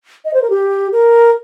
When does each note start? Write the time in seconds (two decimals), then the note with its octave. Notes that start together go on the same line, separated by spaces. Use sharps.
0.25 D#5
0.34 C5
0.42 A#4
0.50 G4
0.92 A#4